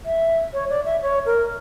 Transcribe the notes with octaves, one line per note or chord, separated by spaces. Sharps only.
E5
C#5
D5
E5
C#5
A#4